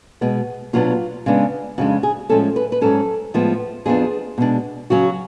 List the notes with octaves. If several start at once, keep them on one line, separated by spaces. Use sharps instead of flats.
B2 G#3 B3
B2 F#3 B3 D4 F4
C#3 G#3 B3 D4
F2 C#3 G#3 D4 F#4
G#4
A2 F3 G#3 C#4 A4
B4
B4
G#2 F#3 C#4 A4
A2 F3 G#3 B3
F2 F3 G#3 B3 D4 G#4
B2 G#3 D4
C#3 F#3 C#4 F#4